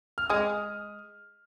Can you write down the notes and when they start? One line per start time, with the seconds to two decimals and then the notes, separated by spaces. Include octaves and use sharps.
0.18 F6
0.30 G#3 D#6